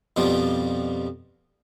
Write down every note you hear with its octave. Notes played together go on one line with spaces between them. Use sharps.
F2 B2 F3 G3